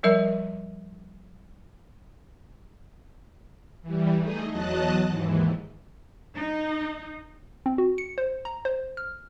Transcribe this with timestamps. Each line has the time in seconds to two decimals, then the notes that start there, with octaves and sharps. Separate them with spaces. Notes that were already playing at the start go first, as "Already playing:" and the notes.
0.03 F3 G3 A#4 E5
3.82 E3 G3
4.18 A3 D#4 G#4 D#5
4.49 E2 F#3 D#5 A5 F#6
5.08 D#2 G#2 E3
6.35 D#4
7.66 C4
7.78 F#4
7.98 C#7
8.18 C5
8.45 A#5
8.65 C5
8.97 F6